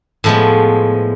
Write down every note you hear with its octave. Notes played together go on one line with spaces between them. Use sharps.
A2 F3 G#3 B3